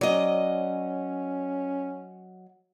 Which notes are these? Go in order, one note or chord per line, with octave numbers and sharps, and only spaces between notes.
F#3 C#4 D5 D#5